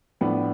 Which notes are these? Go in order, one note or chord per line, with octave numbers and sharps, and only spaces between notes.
A2 F3 B3 D4